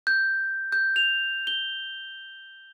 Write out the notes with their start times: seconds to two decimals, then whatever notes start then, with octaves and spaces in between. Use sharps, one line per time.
0.07 G6
0.72 G6
0.96 F7
1.47 G7